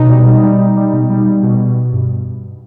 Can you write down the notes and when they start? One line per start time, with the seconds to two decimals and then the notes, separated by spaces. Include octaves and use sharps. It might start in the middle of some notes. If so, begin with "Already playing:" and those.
Already playing: B2 D#4
0.10 G3
0.27 G3
0.43 G3
0.59 G3
0.76 G3
0.93 B2
1.10 G3
1.26 G3
1.43 B2
1.59 B2
1.76 B2
1.93 G2